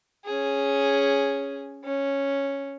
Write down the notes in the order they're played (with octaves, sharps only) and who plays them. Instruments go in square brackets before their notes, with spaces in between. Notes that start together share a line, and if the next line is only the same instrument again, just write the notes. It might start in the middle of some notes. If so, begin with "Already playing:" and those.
[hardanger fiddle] C#4 G#4
C#4